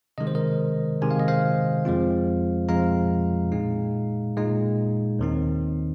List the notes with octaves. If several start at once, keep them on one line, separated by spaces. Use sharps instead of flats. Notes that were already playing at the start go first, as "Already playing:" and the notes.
C3 D#3 G#3 D#5
C5
A#4 D#5
C3 D#3 G#3 G#5
F5
D#5
C5 F5
F2 F3 G#3 C4 F4
F2 F3 G#3 C4 F4 F5 A#5
A#2 G#3 D#4
A#2 G#3 D#4
D#2 D#3 C4 D#4